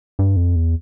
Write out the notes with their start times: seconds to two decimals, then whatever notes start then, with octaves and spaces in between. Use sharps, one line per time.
0.19 G2
0.36 F2
0.56 E2